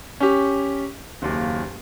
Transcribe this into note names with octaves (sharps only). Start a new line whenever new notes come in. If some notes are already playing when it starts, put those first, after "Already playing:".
C#4 G4
F#1 D#2